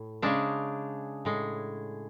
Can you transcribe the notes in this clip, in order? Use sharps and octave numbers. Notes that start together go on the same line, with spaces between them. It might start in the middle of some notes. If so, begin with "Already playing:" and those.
Already playing: A2
C#3 G#3 D4
A2 G#3